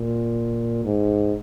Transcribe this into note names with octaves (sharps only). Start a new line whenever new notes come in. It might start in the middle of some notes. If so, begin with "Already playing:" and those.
Already playing: A#2
G#2